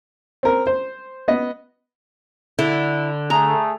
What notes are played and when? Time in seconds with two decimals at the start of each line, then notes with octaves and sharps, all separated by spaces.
0.43 C4 A#4
0.67 C5
1.28 B3 D#5
2.59 D3 E4
3.30 A3 G#4 A#5